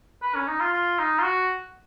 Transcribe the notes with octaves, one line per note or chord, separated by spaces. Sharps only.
B4
C#4
D#4
F4
F4
D#4
F4
F#4